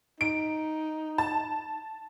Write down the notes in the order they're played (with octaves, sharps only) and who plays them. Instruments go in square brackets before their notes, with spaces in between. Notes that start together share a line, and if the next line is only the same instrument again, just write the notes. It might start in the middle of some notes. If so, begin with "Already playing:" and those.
[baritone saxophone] D#4 [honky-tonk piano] D7
[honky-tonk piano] A5